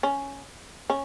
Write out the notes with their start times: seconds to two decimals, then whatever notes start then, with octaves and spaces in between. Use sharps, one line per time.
0.03 C#4
0.90 C#4